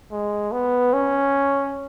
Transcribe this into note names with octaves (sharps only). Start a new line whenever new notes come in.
G#3
B3
C#4